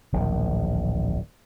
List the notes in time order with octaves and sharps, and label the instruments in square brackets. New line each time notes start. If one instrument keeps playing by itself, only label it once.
[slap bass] D1 A#1 D#3